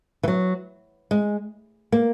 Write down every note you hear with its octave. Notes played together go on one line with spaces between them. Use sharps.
E3
F#3
G#3
A#3